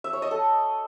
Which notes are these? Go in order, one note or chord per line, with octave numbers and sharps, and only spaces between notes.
E5
C#5
D#5
A4